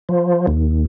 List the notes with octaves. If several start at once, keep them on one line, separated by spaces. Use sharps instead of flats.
F3
D#2